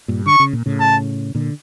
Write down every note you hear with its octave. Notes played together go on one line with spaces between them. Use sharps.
G2 A#2
D3 C#6
C#3
A#2
A2 C#3
A5
A#2 D3